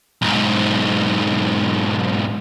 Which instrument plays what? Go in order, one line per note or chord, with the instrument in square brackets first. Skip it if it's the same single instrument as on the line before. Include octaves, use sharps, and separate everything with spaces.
[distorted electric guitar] B1 G#2